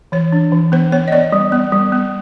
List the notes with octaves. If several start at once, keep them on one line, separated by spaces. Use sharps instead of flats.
E3 C#5
D4
E3
B3 C5
B3 C#5
D#5
B3 D5
G3
B3
G3
B3